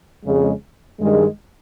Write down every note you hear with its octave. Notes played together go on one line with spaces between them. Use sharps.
F2 C#3 G#3
G2 D#3 G#3